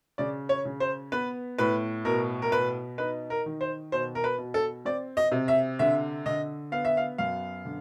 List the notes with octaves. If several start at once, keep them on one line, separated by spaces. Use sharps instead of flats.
C#3 D5
C#5
C#3
C5
B3 B4
A2 B4
B2 A#4
A#4
B2 B4
D#4 B4
A#4
D#3
C5
B2 C5
A#4
B4
B2
A4
C4 D5
D#5
C3
E5
D3 E5
D3 D#5
B3 F5
E5
F5
F#2 F5
D3